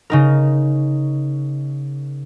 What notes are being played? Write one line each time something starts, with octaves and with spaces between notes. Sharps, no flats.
C#3 D#4 A#4